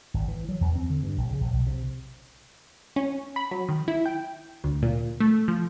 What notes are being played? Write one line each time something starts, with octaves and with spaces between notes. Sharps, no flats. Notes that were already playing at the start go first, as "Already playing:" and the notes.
G#1
E3
F#3
E2
C4
D3
G2
A#1
C#3
A#1
B1
C3
C#4
B5
F#3
D#3
E4
G5
D2
A#2
A3
F3